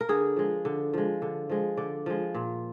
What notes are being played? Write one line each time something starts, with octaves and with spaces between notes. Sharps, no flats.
A#4
D3 G#4
F3 G#3
D3
F3 G#3
D3
F3 G#3
D3 D5
F3 G#3
A#2